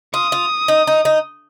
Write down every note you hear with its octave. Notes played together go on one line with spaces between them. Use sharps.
F4 D#6
F4
D#4
D#4
D#4